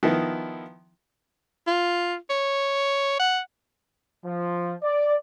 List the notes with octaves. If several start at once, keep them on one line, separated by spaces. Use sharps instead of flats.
D#3 F3 B3 D#4 E4
F4
C#5
F#5
F3
D5